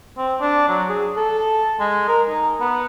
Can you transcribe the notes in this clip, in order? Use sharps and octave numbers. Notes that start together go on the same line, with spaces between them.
C4
D4
F#3
G#4
A4
G#3
A#4
D#4
B3